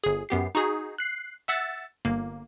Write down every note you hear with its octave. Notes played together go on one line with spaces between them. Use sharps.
G1 G#4
F#2 B3 G4 C7
D#4 F#4 G#4
F#6 C7
E5 F#5 E6 A6
G1 A#3